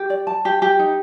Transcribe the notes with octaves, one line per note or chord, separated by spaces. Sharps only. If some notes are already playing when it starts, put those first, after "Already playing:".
Already playing: G4
D5
A5
G4
G4
D#4